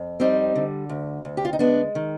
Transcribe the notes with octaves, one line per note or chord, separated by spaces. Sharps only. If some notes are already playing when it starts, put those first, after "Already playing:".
Already playing: F2
G3 C4 D#4
D3
D2
D2
G4
F4
D#4
G#3 B3 D4
D#3